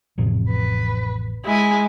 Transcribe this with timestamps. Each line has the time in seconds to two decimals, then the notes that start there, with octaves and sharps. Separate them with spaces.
0.18 A1 F2 C3
0.50 B4
1.45 G#3 E4 G#5